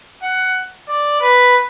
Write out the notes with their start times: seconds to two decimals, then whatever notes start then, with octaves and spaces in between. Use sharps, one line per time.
0.23 F#5
0.89 D5
1.21 B4